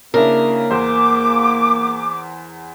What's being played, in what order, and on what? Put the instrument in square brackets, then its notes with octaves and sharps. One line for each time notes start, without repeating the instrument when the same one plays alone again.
[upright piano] C#3 D4 E4 [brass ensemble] A#3 [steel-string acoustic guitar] A#4
[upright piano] E2 C5 [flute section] D6